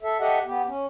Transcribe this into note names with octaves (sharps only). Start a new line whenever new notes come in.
A4 E5
G4 A4 D#5 E5 F#5
B3 G4
C#4